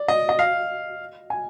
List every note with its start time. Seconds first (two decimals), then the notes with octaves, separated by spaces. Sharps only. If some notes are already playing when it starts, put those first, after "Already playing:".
Already playing: D5
0.08 D#5
0.29 D#5
0.39 F5
1.30 G#5